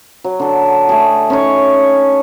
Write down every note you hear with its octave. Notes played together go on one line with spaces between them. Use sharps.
F#3
D3 A4
A3 G#4
C#4 D#4 C#5